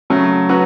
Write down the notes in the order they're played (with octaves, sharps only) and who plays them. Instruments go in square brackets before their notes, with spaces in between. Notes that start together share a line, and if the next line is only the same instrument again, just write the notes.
[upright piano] C#3 F#3 A3
F#3 C#4 F#4 B4